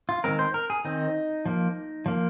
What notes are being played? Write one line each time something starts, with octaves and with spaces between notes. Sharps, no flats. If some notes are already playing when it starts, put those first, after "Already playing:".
F4
D#3 G#3 C4 A#4
C5
A#4
G#4
D#3 C4 D#4
F3 A#3
F3 A#3